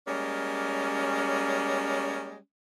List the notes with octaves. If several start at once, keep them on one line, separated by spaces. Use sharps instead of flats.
G3 G#3 A#3 C#4